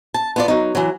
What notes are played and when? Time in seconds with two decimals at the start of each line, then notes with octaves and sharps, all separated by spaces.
0.14 A5
0.36 B3 F4 D5
0.48 F#3 D#4
0.75 E3 F#3